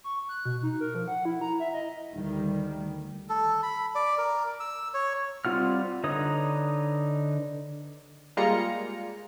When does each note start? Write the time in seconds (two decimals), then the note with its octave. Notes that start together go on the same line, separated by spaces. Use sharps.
0.04 C#6
0.29 F#6
0.45 B2
0.63 D#4
0.80 A#4
0.95 F3
1.08 F#5
1.25 E4
1.41 A#5
1.60 E5
1.73 D#5
2.12 D2 D#3 G3
3.29 A4
3.63 B5
3.95 D5
4.18 A#4
4.60 E6
4.94 C#5
5.45 G3 C4 F4 F#5 F6
6.04 D3 D#4 B4 C#5 D#6
8.37 G3 G#3 A#3 F4 A#5 C#7